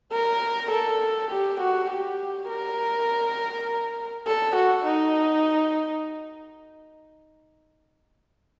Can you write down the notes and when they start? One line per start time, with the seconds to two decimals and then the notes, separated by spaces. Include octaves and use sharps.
0.13 A#4
0.71 A4
1.31 G4
1.61 F#4
1.91 G4
2.49 A#4
4.27 A4
4.56 F#4
4.86 D#4